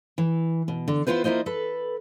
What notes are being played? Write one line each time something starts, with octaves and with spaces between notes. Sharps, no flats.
E3
B2
D3
B3 E4 F4 B4 C5
A#3 E4 F4 C5 D#5
A4 B4